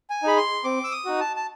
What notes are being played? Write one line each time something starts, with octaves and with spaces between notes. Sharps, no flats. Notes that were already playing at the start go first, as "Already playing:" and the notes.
G#5
D#4 G#4 B5
C6
C4 D6
E6
D#6
D#4 F#4
A5
A5